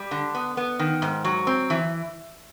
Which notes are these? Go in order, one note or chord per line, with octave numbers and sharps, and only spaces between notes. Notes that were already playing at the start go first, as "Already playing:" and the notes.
Already playing: G3
D3
B3
B3
D#3
G#2
F#3
C4
E3